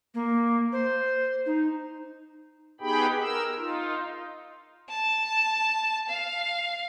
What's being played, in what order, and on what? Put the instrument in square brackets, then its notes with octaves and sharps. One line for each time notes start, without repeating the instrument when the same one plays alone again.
[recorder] A#3
C5
D#4
[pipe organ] B3 D#4 G4 G#4 G5 B5
A#4 E6
D#4 F4
[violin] A5
F5